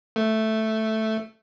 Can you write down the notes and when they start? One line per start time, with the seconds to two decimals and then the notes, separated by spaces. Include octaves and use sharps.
0.16 A3